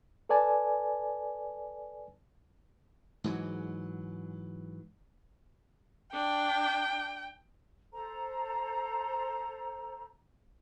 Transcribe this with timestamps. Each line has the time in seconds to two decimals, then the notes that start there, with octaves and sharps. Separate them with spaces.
0.29 A4 B4 D5 G#5 A5
3.24 G#2 E3 F#3
6.13 D4 G5
7.92 A4 C5 A#5